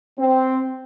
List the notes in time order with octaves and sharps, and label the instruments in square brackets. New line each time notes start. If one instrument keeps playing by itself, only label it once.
[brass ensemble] C4